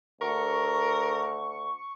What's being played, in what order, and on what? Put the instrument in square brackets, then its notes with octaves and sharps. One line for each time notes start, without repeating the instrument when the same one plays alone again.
[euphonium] D2 [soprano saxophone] A#4 [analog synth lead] C#6